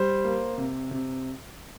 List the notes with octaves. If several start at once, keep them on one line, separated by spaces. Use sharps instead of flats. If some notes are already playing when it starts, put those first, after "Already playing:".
Already playing: G3 C5
A#3
C3
C3